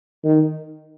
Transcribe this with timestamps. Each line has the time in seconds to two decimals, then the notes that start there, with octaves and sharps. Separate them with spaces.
0.24 D#3